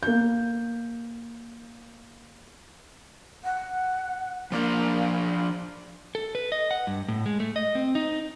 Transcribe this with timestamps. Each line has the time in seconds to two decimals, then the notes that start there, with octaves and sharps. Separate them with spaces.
0.03 A#3 G6
3.44 F#5
4.52 F3 A#3 D4 F5
6.15 A4
6.35 B4
6.52 D#5
6.71 F#5
6.87 G2
7.08 A2
7.26 G#3
7.40 A3
7.56 D#5
7.75 C4
7.95 D#4